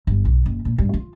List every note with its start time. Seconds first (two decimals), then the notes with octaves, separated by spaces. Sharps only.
0.07 G1
0.25 B1
0.46 F#1
0.65 A#2
0.78 G2
0.94 F4